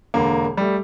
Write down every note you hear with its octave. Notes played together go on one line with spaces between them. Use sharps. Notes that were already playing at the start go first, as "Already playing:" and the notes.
E1 D3 A#3
G3 A3